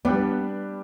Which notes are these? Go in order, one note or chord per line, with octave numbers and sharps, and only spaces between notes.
G3 B3 D4 G4 B4 D5